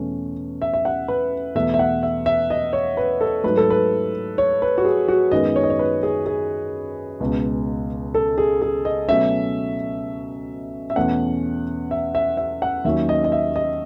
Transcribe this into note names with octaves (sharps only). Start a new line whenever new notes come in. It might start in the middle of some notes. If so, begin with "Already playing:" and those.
Already playing: E2 B2 A3 C#4
E5
E5
F#5
B4
E2 B2 A3 E5
E5
F#5
E5
E5
D#5
C#5
B4
A4
G#2 F#3 A3 B4
A4
B4
C#5
B4
F#4
G#4
F#4
F#2 D#3 G#3 B3 D#5
C#5
D#5
C#5
B4
G#4
G#4
C#2 B2 G#3
A4
G#4
G#4
D#5
B2 F#3 A3 C#4 E5
E5
E2 B2 A3 C#4 F#5
E5
E5
E5
F#5
D#2 D#3 F#3 C#4 E5
D#5
D#5
E5
D#5